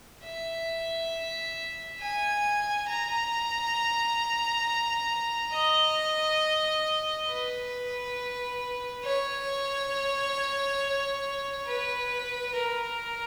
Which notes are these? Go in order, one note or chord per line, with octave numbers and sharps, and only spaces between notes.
E5
G#5
A#5
D#5
B4
C#5
B4
A#4